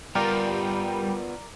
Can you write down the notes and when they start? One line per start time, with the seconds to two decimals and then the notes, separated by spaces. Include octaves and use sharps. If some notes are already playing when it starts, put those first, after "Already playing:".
0.15 G3 B3 F4 A#4 D5